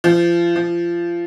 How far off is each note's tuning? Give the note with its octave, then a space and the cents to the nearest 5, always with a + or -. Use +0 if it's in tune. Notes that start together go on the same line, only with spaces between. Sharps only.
F3 -30
F3 -25